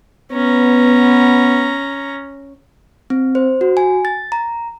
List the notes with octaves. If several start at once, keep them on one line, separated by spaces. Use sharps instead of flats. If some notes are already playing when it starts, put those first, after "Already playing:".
B3 C#4 A#5
C4
C5
F#4
G#5
A6
A#5